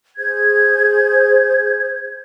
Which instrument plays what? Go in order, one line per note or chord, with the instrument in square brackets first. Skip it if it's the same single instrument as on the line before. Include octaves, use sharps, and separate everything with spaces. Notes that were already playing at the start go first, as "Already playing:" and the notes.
[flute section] G#4 C5 G6 G#6